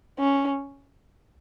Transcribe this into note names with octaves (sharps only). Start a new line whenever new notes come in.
C#4